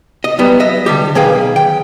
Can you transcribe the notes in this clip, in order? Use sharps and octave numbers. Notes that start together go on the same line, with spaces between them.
D#5
F#3 G3 B3 B4
D#5 E5
D3 G3 G4
B1 D#3 G#4 B4 F5 G5
G5